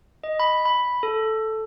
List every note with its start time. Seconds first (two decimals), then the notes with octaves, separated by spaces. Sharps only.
0.24 D#5
0.40 B5
0.65 B5
1.03 A4